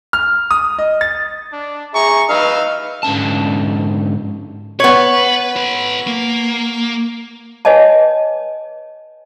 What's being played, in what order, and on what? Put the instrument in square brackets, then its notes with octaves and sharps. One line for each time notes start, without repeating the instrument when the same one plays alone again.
[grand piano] F6
D#6
D#5
A6
[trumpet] D4
[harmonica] G#4 E5 A#5 [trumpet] C#6
[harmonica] D#4 B4 E6 [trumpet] F5
[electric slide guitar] G#2 D3 C#4 A5
[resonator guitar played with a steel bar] B3 C#5 [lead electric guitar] B4
[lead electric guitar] A4 B4
A#3
[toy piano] B4 C#5 D#5 G#5 A5